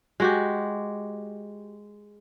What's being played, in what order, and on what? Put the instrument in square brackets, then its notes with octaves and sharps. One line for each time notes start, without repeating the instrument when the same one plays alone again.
[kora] G#3 F#4 G4